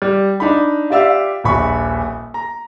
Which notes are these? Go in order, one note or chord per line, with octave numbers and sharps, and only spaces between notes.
G3
D4 D#4 B5
F4 G4 D5 E5 F5 E6
D#1 A#1 B5 C#6
A#5